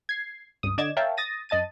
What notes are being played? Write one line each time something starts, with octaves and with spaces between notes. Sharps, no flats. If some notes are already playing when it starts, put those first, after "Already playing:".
G#6 C7
C#2 G2 D#6
D3 D5 D#5 D6 G#6 E7
A#4 C#5 E5 F5 G5 A5
D#6 A6 A#6 D#7
F#2 D#5 A5 A6 D#7